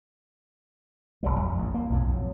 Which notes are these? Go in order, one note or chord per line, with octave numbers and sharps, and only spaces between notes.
D#1 A#1 F#3 G3
F2
A1
A#3
B1 F2 A2
F#3